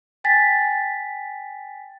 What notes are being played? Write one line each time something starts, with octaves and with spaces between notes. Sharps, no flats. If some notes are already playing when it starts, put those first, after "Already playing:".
G5 G#5 A6 B6